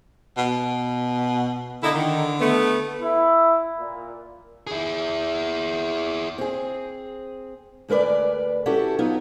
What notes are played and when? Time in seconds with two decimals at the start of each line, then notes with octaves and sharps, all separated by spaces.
0.37 B2
1.83 D3 A#3 D#4 E4
1.95 D#3
2.40 A3 B3
3.01 E4
3.79 A#2
4.67 E4 G#4
6.38 C4 G#4
7.88 D2 G#3 A#4 B4 D5
8.66 C#4 E4 F#4 G4 A4
8.99 F#3 B3 D#4 F4